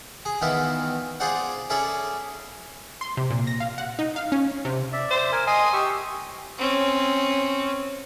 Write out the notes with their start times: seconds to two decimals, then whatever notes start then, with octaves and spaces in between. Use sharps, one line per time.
0.25 G#4
0.41 D#3 E3 B3 E4 F4
1.20 F4 G#4 C5 D5 F#5
1.70 C#4 E4 G#4 A4 C#5 D5
3.01 C6
3.17 C3
3.31 A#2
3.47 A#6
3.60 F5
3.78 F#5
3.99 D#4
4.16 F5
4.32 C#4
4.65 C3
4.93 D5 E5
5.10 C5
5.32 A#4 G#5
5.47 D#5 G#5 C6 D#6
5.73 G4 C#6 E6
6.58 C4 C#4